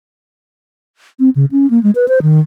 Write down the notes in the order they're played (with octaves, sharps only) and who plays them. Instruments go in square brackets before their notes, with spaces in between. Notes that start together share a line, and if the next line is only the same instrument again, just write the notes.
[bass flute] C4
C#3
C#4
A#3
G#3
B4
C5
D#3